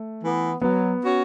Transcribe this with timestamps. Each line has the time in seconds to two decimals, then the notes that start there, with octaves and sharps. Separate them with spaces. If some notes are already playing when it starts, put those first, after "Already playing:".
Already playing: A3
0.22 E3 B3
0.62 F#3 B3
1.02 C#4 F#4 C#5